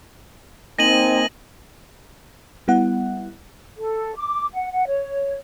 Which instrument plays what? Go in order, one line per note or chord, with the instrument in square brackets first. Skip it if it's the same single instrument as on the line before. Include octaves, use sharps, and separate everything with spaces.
[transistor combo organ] A#3 D#5 G#5 [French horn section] C4 D#4 [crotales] A#6 D#7 F#7
[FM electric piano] G3 B3 E4 F#5
[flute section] A4
D6
F#5
F#5
C#5